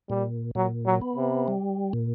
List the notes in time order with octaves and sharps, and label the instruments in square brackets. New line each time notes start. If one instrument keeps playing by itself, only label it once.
[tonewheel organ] A#2 [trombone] G3
[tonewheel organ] A#2 [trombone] F#3
[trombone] F#3
[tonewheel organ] B3
[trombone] C3
[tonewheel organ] G3
A#2